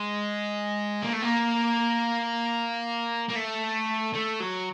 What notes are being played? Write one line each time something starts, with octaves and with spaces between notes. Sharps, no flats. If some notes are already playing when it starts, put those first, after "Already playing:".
Already playing: G#3
A#3
A3
A#3
A#3
A3
A3
F#3